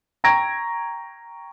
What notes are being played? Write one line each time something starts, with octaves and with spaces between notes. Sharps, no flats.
G5 A#5 C#6 G#6 A#6 D7